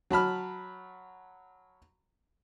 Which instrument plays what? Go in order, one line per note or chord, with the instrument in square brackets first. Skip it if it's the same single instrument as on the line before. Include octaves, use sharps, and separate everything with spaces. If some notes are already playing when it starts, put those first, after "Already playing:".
[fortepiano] F#3 A5 B5 F6